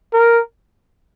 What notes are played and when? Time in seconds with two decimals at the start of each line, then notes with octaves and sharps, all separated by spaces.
0.13 A#4